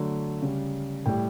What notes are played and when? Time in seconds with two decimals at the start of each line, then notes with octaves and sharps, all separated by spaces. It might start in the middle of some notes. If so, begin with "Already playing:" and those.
Already playing: D3 F#3 A3
0.42 C#3 G3
1.06 A2 G3 G5